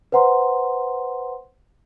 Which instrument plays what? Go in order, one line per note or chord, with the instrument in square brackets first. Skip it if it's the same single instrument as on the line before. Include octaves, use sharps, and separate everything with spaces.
[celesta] B4 C5 F#5 A#5 C6